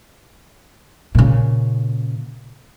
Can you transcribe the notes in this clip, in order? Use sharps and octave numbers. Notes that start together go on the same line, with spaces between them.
A#2 C#3